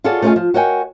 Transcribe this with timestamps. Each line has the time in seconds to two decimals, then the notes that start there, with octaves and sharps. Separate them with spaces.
0.04 F4 F#4 G#4 A4 C#5 D5
0.22 A3 C#4 F4 G#4 D#5 G#5
0.36 F3
0.54 F#4 A#4 C#5 D#5 G5 G#5